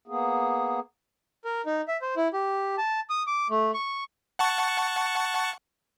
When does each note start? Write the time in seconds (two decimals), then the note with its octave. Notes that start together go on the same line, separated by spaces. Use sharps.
0.08 A#3 B3 G#4
1.45 A#4
1.66 D#4
1.88 E5
2.02 C5
2.16 E4
2.33 G4
2.78 A5
3.10 D#6
3.27 D6
3.50 A3
3.74 C#6
4.39 F#5 A5 C#6